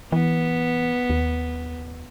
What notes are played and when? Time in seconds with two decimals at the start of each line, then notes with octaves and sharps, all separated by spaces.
0.12 E3 B3
1.10 D#2